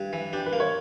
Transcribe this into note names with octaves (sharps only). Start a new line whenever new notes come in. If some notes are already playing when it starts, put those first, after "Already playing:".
Already playing: G2
E3
D4 G4
B4
A#3
C#5